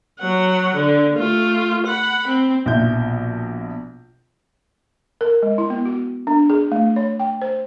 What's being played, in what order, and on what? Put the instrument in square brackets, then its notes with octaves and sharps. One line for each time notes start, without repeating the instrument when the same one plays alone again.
[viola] F#3 F#5
D3
A3 F4
F#5 B5
C4
[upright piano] A#1 B2 E4 G6
[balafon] A#4
G#3
E4
B3
F#4
D4
G#4
A3
C#5
G5
C5